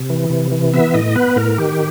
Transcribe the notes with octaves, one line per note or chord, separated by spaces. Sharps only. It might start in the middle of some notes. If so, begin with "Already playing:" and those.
Already playing: C3
E3
C3
E3
B3 E5
A2 D#5
B3 B4
A2 A#4
D#3 G4